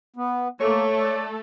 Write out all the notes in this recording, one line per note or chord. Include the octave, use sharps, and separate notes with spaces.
B3
A3 A#3 A4 C#5
D5